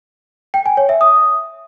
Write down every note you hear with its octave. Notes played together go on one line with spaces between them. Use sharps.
G5
G#5
C#5
E5
D#6